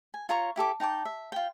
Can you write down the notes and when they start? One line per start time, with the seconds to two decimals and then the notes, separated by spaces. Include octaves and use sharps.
0.14 G#5
0.29 F4 C#5 A#5 C#6
0.56 E4 G4 A4 D6
0.80 D#4 G5 A5 D6
1.05 E5
1.32 F4 G5